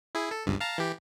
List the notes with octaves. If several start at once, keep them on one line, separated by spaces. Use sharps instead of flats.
E4 G#4
A4
G1 C#2 G2
F5 A5 A#5
E3 G4